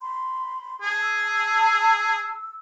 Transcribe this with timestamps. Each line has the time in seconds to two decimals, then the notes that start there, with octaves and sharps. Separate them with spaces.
0.01 B5 C6
0.82 G#4 A5
1.01 E6